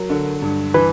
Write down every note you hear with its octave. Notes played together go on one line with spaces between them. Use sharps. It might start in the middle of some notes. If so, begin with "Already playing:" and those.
Already playing: F#3 A#4
D3
G2
E3 B4